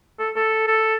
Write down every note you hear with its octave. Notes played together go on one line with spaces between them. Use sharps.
A4
A4
A4